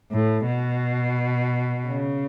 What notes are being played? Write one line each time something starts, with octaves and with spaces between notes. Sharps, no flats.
A2
B2
C#3